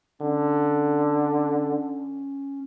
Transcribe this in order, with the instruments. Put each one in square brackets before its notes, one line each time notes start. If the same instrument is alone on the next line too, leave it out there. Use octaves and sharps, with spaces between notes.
[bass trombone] D3 [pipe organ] C#4